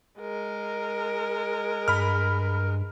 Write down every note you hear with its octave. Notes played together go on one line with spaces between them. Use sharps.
G#3 A#4
G2 B5 F6